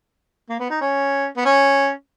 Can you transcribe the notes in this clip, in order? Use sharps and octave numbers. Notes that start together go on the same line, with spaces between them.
A#3
B3
D#4
C#4
B3
C#4